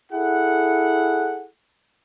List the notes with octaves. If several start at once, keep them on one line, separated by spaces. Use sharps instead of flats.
E4 G#4 A4 F#5